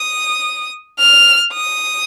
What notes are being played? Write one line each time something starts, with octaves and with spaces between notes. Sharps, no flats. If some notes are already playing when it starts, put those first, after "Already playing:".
Already playing: D#6
F6
D#6